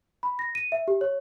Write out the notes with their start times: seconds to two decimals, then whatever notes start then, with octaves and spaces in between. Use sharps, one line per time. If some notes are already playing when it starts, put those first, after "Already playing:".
0.23 B5
0.39 A#6
0.55 D#7
0.72 E5
0.88 G4
1.01 C#5